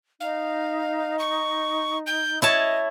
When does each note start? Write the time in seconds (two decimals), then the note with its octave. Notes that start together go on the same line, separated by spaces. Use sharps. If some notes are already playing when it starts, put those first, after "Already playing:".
0.20 D#4 F5
1.19 C#6
2.06 G6
2.42 E4 C#5 D#5 A5